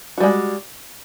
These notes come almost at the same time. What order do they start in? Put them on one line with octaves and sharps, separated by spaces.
F#4 G3 G#3